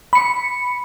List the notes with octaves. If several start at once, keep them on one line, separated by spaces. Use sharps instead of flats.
B5 C#7